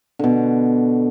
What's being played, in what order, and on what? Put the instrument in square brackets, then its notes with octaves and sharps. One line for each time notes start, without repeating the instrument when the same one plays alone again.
[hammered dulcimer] B2 D3